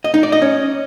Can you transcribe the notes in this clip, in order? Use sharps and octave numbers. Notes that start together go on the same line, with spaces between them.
D#5
D#4
D5
D#5
C#4